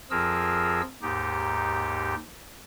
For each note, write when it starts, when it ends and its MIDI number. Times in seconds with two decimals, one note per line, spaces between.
0.11 0.82 41
0.11 0.82 53
0.11 0.82 65
0.11 0.82 68
0.11 0.82 70
0.11 0.82 88
1.02 2.15 39
1.02 2.15 44
1.02 2.15 63
1.02 2.15 67